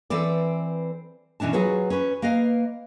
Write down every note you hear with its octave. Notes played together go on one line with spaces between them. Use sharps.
E3 C4 A4 B4 D5
B2 E3 C#4 D4 A5
F#3 F4 G#4 B4 C#5
C#4 B4
A#3 B4 D#5 F5